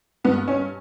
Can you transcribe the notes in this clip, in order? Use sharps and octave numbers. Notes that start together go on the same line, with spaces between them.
G2 B3
C#4